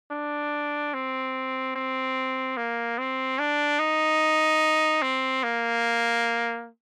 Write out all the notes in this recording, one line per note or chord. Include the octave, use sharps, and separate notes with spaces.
D4
C4
C4
A#3
C4
D4
D#4
C4
A#3